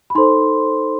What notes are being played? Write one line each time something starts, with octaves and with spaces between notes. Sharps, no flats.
B5
D#4 A4 C5 C6